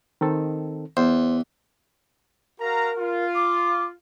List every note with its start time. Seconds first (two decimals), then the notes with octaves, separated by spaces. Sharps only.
0.21 D#3 C4 A4
0.97 E2 C5
2.59 F#4 A#4 F5 A#5
2.98 F4
3.35 D6